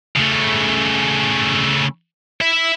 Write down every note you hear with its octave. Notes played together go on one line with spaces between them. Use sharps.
C#3 A3
E4 E5